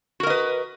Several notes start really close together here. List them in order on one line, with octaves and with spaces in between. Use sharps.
F#4 A#4 D#5 B4